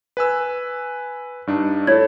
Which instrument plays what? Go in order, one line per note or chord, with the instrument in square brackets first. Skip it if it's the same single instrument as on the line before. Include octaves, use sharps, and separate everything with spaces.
[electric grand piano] B4 G#5 E6
G2 D4 D#4
[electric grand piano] E4 A4 [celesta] C#5 G#6